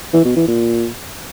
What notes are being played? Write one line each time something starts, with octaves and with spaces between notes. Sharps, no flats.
E3
B2
E3
A#2